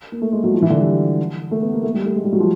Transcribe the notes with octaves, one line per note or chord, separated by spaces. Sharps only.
A#3
A3
G#3
F#3
F3
E3
D3
G3
A3
B3
A#3
A3
G3
A3
G#3
G3
F#3
F3